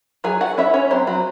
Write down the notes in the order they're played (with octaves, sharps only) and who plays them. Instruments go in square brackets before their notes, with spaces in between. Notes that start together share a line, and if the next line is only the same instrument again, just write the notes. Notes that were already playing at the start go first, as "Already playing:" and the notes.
[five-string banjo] F#3 G#4 G#5
F#4 F#5
C#4 E4 E5
C#4 C#5
F#3 C4 C5
F#3 F#4